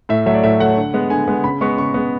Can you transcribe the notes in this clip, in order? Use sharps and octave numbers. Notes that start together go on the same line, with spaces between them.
A2 E5
F#3 A3 E5
D5
A2 E5
F#3 A3 F#5
D3
G#3 B3
D3 G#5
G#3 B3
C#3 B5
G#3 B3 C#6
C#3 C#6
G#3 B3